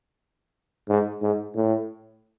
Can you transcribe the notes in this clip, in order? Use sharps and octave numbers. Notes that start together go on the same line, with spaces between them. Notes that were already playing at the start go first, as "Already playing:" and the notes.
G#2
G#2
A2